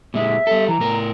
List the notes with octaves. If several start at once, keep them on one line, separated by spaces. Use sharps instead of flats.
A#2 G#3 E5
G3 A4
E3 A#5
A2 A#4